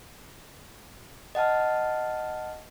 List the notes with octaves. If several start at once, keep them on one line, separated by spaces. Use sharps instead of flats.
D#5 F#5 A5 F6